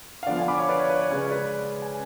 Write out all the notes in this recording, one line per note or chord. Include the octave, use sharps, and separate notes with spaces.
F5
D3 F3 B3 D5 F#5
F5 G#5
B5 D6
C#5 F5
B4 D5
C#5
B4
C#5
C#3 G#3 C#4 C#5
B4 D5
G#5